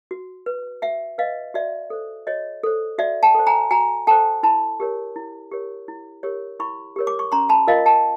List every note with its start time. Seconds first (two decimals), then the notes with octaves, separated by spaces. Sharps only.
0.11 F#4
0.46 B4
0.82 F#4 E5 F#5
1.18 B4 D#5 F5
1.54 F#4 D5 E5
1.90 A4 C5
2.27 F#4 C#5 D#5
2.64 A4 C5
2.98 F#4 D5 E5
3.23 G5 A5
3.35 A4 C5
3.47 G#5 A#5
3.71 F#4 G#5 A#5
4.07 A4 C5 G5 A5
4.43 E4 A5 B5
4.80 G4 A#4 C#5
5.16 E4
5.51 G4 A#4 C#5
5.88 E4
6.23 G4 A#4 C#5
6.60 E4 B5 C#6
6.96 G4 A#4 C#5
7.07 D6
7.19 C#6
7.32 C#4 A#5 C6
7.49 A5 B5
7.67 F4 A#4 D#5 F5
7.86 G5 A5